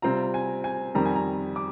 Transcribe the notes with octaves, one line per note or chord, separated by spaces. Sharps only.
C3 G3 C4 F4 A#5
G#5
G#5
F2 D#3 G3 A#5
G#5
A#5
D6